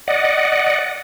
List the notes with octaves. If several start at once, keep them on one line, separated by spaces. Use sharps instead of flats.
D5 D#5 F#5